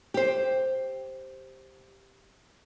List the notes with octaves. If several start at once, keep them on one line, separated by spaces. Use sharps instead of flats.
G4 C5